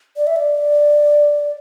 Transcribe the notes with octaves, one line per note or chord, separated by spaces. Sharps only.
D5
E5
D5